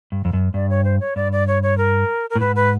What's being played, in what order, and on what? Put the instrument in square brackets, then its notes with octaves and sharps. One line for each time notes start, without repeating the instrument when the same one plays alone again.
[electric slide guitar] G2
F2
F#2
[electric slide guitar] G2 [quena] D5
[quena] C#5
C5
C#5
[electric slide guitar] G2 [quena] D5
[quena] D5
C#5
C#5
A#4
A#4
[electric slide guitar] A2
[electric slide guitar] G#2 [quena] B4
[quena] B4